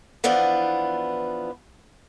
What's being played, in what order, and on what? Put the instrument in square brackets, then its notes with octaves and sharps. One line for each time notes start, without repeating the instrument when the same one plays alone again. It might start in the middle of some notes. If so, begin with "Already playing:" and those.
[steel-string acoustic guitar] E3 F3 B3 D4